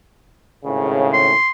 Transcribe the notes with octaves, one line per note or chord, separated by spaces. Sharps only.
G#1 A2 C#3
C6